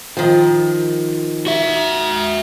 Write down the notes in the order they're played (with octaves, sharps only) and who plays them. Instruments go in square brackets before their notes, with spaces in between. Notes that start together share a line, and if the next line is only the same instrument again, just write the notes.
[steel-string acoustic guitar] D#3 F3
[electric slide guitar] F#4 E5